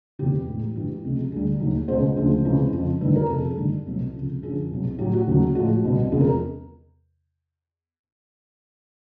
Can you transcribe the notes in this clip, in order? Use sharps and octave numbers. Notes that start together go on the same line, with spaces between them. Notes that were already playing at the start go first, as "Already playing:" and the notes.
E2 C3 D#3 G4
A2 E3 G#3
G2 E3 G#3 G4
C#2 C3 F3 G#3
D2 D3 G3 G#4
D#2 D#3 F#3
C#2 B2 G#3 C5
D2 C#3 F3 G#3
C#2 C3 E3 G#3
F2 C#3 F3
G2 D#3 G3 B4
A#4
F2 C3 F3 A4
G#4
A4
G2 D#3 G3
C2 B2 F#3
C#2 C3 F3
F#2 D3 F3 G#4
C2 B2 F#3
A2 F#3 G4
F#4
D#2 C#3 F#3
A2 F3 G#3 F#4
C2 B2 G3
E2 C3 F3 G#3 G#4
A#4